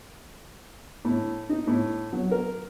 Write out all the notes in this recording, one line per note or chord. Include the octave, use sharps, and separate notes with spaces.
A2
D#4
A2
F#3
A#4